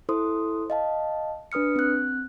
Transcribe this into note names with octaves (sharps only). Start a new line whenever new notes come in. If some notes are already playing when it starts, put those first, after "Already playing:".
E4 A4 C5 C6 D#6
D#5 F5 A5
D4 B4 D#6 F6 C#7
C4 F#6